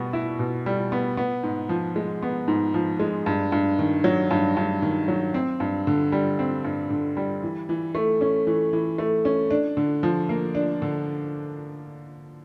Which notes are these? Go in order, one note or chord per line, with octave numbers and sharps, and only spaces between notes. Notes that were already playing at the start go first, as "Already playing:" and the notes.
Already playing: B2 G3 B3
E4
B2
G3
B3
B3
G#2
F3
G#3
B3
G#2
F3
G#3
G2
G2
D#3
F#3
G2
G2
D#3
F#3
C4
G2
D3
G3
C4
G2
D3
G3
E3
E3
A3
C#4
E3
E3
A3
C#4
D4
D3
F3
A#3
D4
D3